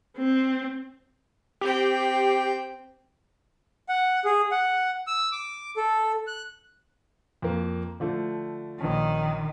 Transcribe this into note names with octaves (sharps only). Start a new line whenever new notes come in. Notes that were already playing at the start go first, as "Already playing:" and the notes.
C4
C4 G4 G5
F#5
G#4
F#5
E6
D6
A4
F#6
F2 A#3
D3 F3 A3
A#1 D#3 C#4